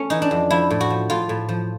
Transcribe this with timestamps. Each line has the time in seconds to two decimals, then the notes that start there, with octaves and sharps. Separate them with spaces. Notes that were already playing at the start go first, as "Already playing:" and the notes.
Already playing: A3 C#4
0.10 E3 D#4
0.22 D4
0.31 F2
0.51 F3 E4
0.71 A2
0.81 F#4
0.90 F3
1.10 A2 F4
1.29 A2
1.49 F3